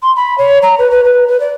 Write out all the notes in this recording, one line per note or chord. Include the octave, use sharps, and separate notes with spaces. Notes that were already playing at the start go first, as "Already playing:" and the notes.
C6
B5
C#5
A#5
B4
B4
B4
B4
D5